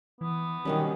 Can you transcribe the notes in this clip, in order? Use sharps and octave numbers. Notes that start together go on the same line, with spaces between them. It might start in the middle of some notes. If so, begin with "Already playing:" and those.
E3 B3
B2 D#3 F#3 G3 C#4